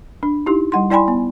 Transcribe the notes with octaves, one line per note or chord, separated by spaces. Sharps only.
D4
D#4 E4 G4
G3 F#5 C6
E4 D5 G5 G#5 B5 C6
B3